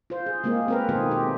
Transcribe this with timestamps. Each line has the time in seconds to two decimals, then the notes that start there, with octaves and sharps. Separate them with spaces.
0.10 F4 C5
0.26 G#4
0.44 G#3 A#3 C4 F4 G#4
0.68 C4 A#4 B4
0.89 B2 D#3 A3 C4 F4 G#4
1.11 G4